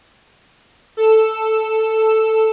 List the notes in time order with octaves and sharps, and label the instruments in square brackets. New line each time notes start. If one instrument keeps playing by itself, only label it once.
[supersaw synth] A4 E6